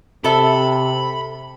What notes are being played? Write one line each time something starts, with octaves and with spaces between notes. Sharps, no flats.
C3 A4 E5 B5